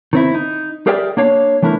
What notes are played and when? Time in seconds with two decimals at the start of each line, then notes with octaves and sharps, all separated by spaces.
0.13 D#3 C4 E4
0.35 D#4
0.87 G4 G#4 A#4 D5 E5 G5
1.17 A#3 D4 C#5 F5
1.62 E3 A3 D4 E4 A#4